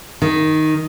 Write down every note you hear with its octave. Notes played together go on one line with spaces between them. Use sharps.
D#3